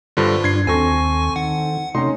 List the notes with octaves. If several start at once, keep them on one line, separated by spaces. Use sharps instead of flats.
G2 D3 F4 C5
G2 D4 G#6 C7
D#2 C4 A4 G#5 C#6 A#6
D#3 F#5
C3 A3 C#4 D#4 C6